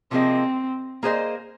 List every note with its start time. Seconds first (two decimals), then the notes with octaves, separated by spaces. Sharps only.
0.11 C3 F3 A#3 C4 G#4 D#5
1.03 A#3 G#4 C5 D#5